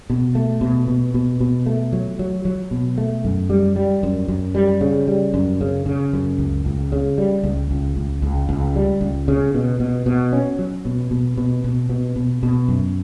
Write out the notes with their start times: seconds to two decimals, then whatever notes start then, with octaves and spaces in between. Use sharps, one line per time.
0.10 B2
0.35 A3
0.61 B2
0.87 B2
1.14 B2
1.41 B2
1.66 A3
1.93 F#3
2.19 F#3
2.45 F#3
2.71 B2
2.98 A3
3.25 F#2
3.50 G3
3.76 G3
4.03 F#2
4.28 F#2
4.55 G3
4.81 C#3
5.08 G3
5.34 F#2
5.61 C#3
5.86 C#3
6.13 F#2
6.38 C#2
6.65 C#2
6.92 C#3
7.18 G3
7.44 C#2
7.71 C#2
7.97 C#2
8.22 C#2
8.49 C#2
8.76 G3
9.01 C#2
9.28 C#3
9.54 B2
9.80 B2
10.06 B2
10.33 C#4
10.59 F#3
10.85 B2
11.11 B2
11.37 B2
11.64 B2
11.89 B2
12.16 B2
12.43 B2
12.68 F#2